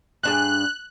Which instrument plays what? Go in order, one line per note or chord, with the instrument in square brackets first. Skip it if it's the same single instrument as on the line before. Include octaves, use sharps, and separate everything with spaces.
[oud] G2 D4 G#4 [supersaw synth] F#6